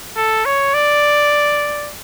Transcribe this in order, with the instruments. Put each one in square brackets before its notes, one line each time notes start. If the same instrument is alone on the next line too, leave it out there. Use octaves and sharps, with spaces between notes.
[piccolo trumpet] A4
C#5
D5